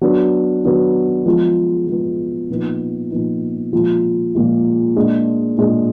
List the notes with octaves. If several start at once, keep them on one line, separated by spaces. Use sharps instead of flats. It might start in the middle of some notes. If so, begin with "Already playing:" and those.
F#3 B3 D4
F#3 B3 D4
F3 G#3 B3
F3 G#3 B3
A#2 F3 B3 D#4
A#2 F3 B3 D#4
A#2 F3 G#3
A#2 F3 G#3
A#2 G#3 D4 G#4
A#2 G#3 D4 G#4